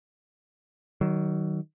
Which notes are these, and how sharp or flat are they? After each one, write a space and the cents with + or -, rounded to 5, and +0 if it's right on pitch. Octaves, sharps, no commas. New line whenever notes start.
D#3 +0 F#3 +25